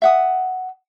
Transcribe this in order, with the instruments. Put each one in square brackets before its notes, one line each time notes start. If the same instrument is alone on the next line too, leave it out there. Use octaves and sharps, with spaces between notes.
[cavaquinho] E5 F#5 D#6